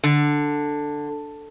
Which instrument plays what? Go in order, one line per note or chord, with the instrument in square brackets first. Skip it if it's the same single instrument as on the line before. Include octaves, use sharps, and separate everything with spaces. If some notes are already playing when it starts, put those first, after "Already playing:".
[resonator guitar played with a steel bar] D3